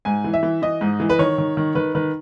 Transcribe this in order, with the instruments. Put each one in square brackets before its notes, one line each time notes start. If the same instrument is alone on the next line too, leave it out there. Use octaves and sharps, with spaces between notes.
[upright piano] G#2 G#5
E3
E5
E3
E3 D#5
G#2
E3
B4
D#3 C#5
D#3
D#3
D#3 B4
D#3 B4